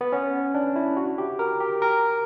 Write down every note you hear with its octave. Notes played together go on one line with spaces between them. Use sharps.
B3
C#4
D4
E4
F#4
G4
A#4
G4
A#4